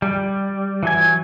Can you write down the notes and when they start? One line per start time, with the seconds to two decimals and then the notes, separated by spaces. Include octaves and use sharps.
0.02 G3
0.83 E3 F#3 G#5